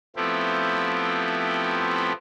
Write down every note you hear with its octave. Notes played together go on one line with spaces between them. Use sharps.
F3 A3 B3 C4 E4 G4